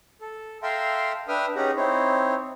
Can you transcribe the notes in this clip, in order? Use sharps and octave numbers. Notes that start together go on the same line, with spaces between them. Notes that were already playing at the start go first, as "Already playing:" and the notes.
A4
A4 E5 F5 G5 A#5 C6
D4 B4 E5 G5 D#6 F6
C#4 D#4 G4 G#4 F#5 A#5
C4 D#4 E4 C5 C#5